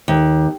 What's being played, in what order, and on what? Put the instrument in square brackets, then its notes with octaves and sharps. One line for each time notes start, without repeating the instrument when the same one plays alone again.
[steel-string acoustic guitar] D#2